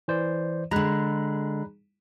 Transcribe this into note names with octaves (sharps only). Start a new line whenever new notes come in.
E3 C5 D5
D3 G#3 A#5 B5 F#6